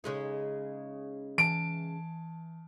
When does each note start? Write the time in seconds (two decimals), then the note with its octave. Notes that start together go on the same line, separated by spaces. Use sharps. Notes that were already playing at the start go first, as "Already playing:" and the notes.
0.04 C#3 G#3 D#4
1.38 E3 A5 D7